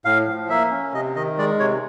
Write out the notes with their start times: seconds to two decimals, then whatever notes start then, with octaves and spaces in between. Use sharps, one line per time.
0.05 A2 F5
0.28 F3
0.50 A#3 E5
0.71 C#4
0.94 C3 D#5
1.16 D#3 D#5
1.38 G#3 D5
1.60 C3 C#5